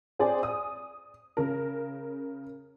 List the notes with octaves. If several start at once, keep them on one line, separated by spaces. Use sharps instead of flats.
C4 G#4 C5 D5
D#6
C#3 A#4